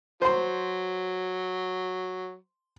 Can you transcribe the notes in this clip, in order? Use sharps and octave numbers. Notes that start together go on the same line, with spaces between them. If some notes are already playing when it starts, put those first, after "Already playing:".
F#3 C5 C6